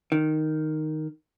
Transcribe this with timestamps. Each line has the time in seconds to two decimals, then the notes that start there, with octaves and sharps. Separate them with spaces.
0.12 D#3